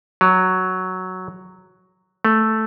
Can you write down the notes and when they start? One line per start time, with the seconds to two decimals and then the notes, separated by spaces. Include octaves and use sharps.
0.21 F#3
2.25 A3